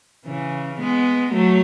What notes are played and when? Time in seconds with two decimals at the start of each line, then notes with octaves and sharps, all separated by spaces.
0.26 C#3 E3
0.79 G#3 B3
1.33 F#3 A3